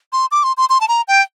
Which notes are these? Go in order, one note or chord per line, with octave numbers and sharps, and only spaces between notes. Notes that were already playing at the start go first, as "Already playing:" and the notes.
C6
D6
C6
C6
C6
A5
A#5
G5